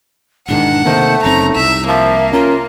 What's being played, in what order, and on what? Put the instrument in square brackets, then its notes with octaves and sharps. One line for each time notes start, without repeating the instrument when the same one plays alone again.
[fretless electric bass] E1 G#2 D#3 [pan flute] D4 [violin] F#5
[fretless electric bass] C3 D#3 A#3 [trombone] A3 [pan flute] C5
[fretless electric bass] F#1 F#2 C4 [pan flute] D#4 [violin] A#5
[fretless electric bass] C2 [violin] E5
[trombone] F3 [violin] A#3 [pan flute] E5
[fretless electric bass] C#4 [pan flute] F4 [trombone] A#4